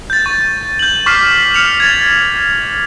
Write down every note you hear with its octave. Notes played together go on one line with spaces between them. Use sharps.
G6 A6
C#6
G6 F#7
C#6 D6 F6 B6 C7
F6 C#7 F7
G#6 A6